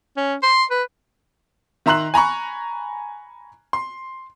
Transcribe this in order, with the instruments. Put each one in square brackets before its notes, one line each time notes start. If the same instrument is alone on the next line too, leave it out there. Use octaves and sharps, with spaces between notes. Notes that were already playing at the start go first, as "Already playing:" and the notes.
[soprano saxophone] C#4
C6
B4
[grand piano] D#3 E5 A#5 C6 F#6 F#7
G#5 A#5 B5 C#6
C6